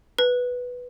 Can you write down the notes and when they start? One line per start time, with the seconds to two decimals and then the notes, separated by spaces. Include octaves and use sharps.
0.19 B4